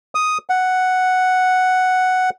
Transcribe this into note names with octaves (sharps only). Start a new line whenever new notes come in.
D#6
F#5